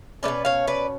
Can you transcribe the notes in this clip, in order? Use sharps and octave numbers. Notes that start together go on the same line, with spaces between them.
A3 C#4 B4 D5
B2
C#5 F5
B4 D5